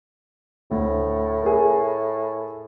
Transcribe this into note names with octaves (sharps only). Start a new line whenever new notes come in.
D2 A2
G#4 A#4